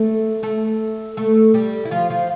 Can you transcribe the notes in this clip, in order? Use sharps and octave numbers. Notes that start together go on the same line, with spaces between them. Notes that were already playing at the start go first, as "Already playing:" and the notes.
Already playing: A3 A4
A3 A4
A3 A4
G3 G4
E4
F3 F4
F3 F4